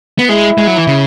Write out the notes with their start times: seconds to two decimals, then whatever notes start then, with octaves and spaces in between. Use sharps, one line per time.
0.18 B3
0.29 G#3 E4
0.58 G#3
0.67 F#3
0.77 E3
0.87 C#3